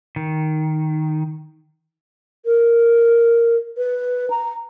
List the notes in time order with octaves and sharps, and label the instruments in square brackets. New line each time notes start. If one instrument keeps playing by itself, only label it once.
[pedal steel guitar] D#3
[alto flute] A#4
B4
A#5